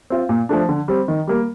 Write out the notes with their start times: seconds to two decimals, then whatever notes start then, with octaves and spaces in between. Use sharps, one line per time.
0.10 C4 F4
0.29 A#2
0.49 F3 A3 D4
0.69 D3
0.88 G3 C4
1.08 D#3
1.27 G3 A#3